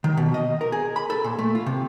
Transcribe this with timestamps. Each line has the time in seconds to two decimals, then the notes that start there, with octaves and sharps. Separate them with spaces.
0.04 D#3
0.17 B2
0.34 D#5
0.61 A#4
0.72 G#4
0.96 B5
1.10 A4
1.24 A#2
1.39 A3
1.55 F4
1.66 C3